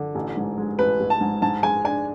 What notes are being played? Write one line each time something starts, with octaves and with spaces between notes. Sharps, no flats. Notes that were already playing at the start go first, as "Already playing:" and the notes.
Already playing: D3
A1
G#2
G#3
A1 B4
A1
A5
G#2
G#2 A5
G#3 G#5
D4 G#5